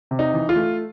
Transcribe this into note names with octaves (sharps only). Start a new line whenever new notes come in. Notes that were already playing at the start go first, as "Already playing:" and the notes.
C3
D#4
E3
F4
A3